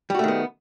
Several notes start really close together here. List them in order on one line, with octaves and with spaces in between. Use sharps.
G3 F#4 A3 D#3 B3